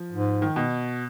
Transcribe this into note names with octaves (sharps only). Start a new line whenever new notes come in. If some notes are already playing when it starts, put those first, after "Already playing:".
Already playing: F3
G#2
D#3
B2